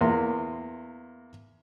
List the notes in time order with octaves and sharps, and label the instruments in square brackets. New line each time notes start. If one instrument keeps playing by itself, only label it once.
[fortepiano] E2 A#3 C6